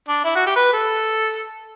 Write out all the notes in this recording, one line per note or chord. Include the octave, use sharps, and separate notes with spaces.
D4
E4
F#4
G4
B4
A4